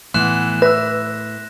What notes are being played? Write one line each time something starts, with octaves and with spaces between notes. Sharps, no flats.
A2 E3 A3 B3 C6 F#6 E7
B4 E5 E6 A#6